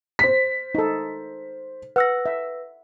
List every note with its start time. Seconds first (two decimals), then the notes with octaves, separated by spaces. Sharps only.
0.19 C5 B6
0.75 D#4 A4
1.96 B4 F#5 E6 A#6
2.26 E5